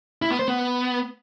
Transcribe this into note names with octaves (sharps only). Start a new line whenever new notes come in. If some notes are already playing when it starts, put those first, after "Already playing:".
E4
B3
C5
B3